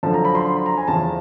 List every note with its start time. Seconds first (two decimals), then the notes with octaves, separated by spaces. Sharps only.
0.03 F#2 D3 F3 A5
0.14 A#5
0.25 B5
0.35 C6
0.45 C6
0.56 B5
0.66 A#5
0.77 G#5
0.88 E2 C#3 F3 A5